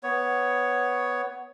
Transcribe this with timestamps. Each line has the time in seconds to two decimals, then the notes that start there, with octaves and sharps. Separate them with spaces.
0.03 B3 C#5